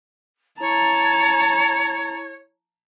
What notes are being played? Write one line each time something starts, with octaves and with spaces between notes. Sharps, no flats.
E4 C#5 A5 A#5